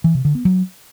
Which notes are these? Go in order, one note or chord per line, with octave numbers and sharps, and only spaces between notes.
E3
C3
D3
B3
F#3